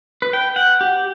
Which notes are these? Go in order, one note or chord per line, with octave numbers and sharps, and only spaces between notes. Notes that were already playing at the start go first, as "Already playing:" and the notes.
B4
G5
F#5
G4